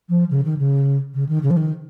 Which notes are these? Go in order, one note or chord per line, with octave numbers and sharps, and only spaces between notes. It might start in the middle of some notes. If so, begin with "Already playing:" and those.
F3
C#3
D#3
C#3
C#3
D#3
C#3
F3
D#3